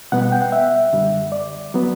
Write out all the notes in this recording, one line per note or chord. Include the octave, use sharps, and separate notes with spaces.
B2 G3 B3 F#5
F#5
G5
F#5
E5
F#2 D3 G3
D5
F#3 B3